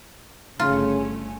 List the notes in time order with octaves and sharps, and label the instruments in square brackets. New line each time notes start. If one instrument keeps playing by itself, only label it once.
[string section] G1 A3 C#4 [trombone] C#3 [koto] F4